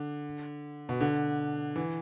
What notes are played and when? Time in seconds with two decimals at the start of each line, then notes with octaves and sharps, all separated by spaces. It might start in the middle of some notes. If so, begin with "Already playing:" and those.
Already playing: D3
0.89 B2
1.01 D3
1.76 E3